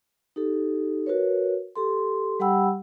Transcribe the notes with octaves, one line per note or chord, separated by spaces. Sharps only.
D#4 G4 A4
F#4 A#4 B4 C#5
G4 A4 C6
G3 G4 F#5 G5 B5 E6